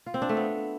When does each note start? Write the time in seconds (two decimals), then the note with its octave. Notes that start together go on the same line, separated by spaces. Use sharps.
0.06 F4
0.14 C4
0.22 D4
0.29 A3
0.37 B3